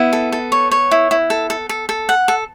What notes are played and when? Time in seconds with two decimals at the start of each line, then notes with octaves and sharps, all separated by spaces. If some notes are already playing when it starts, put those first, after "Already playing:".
Already playing: B3 E4
0.13 A4
0.32 A4
0.52 C#5
0.71 C#5
0.91 E4
1.11 E4
1.30 A4
1.50 A4
1.69 A4
1.89 A4
2.09 F#5
2.28 A4